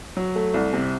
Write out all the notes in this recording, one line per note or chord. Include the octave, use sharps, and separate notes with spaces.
F#3
A3
C2
C3